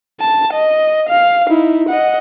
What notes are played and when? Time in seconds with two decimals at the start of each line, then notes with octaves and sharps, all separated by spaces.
0.21 A5
0.54 D#5
1.09 F5
1.47 D#4 E4
1.89 D#5 F#5